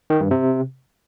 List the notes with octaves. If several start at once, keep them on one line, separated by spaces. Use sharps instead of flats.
D#3
G2
C3